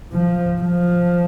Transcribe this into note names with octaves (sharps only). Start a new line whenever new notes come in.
F3
F3